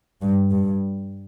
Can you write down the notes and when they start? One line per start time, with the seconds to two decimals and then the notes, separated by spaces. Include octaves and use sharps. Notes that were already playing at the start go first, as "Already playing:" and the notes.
0.22 G2
0.51 G2